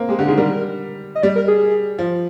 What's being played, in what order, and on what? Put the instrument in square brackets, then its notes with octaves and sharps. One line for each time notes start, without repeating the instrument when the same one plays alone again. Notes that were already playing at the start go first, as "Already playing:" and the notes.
Already playing: [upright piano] A#3 C4
[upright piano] G#3 [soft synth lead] G4
[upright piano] D3 [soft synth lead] G4
[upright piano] D#3 [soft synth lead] G#4
[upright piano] G3 [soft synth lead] A#4
[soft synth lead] D#5
[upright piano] G3 [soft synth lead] D5
[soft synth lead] A#4
G#4
[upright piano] F3